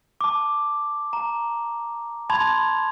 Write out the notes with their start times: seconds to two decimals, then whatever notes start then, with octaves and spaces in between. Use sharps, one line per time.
0.21 A5 D6
1.13 A#5
2.30 A5 B5 C6 G#6 F7